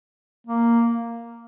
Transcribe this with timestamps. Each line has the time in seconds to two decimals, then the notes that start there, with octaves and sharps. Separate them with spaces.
0.47 A#3